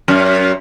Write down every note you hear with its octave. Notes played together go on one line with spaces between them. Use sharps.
F#2